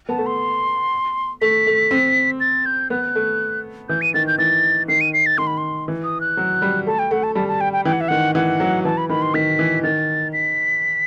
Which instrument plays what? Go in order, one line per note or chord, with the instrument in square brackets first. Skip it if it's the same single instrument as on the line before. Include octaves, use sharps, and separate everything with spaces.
[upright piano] B3 [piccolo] A5
[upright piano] A3
[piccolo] C6
[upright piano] A3 [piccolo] B6
[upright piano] A3
C4
[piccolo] A6
G6
[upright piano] B3 [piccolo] F#6
[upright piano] A3
[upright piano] E3 [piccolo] G6
[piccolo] D#7
[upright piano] D#3 [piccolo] A6
[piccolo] G6
[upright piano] E3 [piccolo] A6
[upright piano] D#3 [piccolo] C7
[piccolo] D#7
C7
A6
[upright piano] D#3 [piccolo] C6
[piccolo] B5
C6
[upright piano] E3
[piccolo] D#6
F#6
[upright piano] F#3
G3
[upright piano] A3 [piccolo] A5
[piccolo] G5
[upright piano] A3 [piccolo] F#5
[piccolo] A5
[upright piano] G3 [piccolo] A5
[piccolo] A5
G5
G5
[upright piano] E3 [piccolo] G5
[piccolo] F#5
E5
[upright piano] D#3 [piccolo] F#5
[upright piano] E3 [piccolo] F#5
[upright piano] F#3
[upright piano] E3 [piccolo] A5
[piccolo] B5
[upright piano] D#3 [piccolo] B5
[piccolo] C6
[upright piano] D#3 [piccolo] B6
[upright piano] E3
[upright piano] D#3 [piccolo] A6
[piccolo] B6